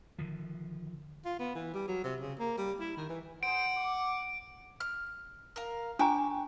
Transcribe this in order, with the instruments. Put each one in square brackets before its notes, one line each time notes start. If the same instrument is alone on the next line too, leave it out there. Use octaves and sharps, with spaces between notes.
[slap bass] D3 D#3 F3
[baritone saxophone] F4
B3
E3
G3
F#3
C3
C#3
A#3
G3
E4
D#3
E3
[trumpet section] G#4 C5 [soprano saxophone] F#5 [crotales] D7
[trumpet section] D6
[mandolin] F6
A#4 F5
[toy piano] D4 G#5 A#5 [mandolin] G5 C#6 D6